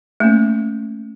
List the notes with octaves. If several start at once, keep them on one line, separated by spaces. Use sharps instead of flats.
A3 A#3 C#4